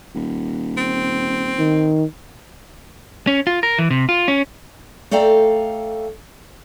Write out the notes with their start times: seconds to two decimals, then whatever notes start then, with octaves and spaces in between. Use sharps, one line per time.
0.15 D#1
0.77 C4
1.59 D#3
3.27 C#4
3.47 F4
3.63 A#4
3.79 E3
3.90 C3
4.09 F4
4.28 C#4
5.11 A3 A4 D5 F5 G5 A#5